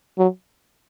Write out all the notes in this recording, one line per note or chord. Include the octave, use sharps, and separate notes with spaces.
F#3